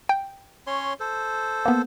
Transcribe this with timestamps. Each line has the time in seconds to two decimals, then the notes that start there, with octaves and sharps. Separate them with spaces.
0.09 G5
0.67 C#4 C#5 C6
1.00 A4 C5
1.66 A#3 B3